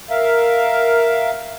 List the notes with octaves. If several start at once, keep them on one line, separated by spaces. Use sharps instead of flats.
A#4 E5 F5